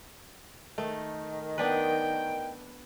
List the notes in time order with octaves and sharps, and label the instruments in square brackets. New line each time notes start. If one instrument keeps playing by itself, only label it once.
[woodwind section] D#3 [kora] A3
[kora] B3 D4 B4 [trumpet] G5